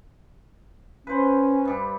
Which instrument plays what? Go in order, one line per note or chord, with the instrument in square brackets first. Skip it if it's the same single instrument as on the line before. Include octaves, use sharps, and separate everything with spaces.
[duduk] C#4 [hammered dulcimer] B4 C5
[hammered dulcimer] G2 G3